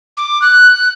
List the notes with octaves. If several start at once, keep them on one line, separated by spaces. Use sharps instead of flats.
D6
F#6